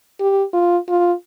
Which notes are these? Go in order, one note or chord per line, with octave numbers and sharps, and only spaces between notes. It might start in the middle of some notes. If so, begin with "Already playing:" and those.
G4
F4
F4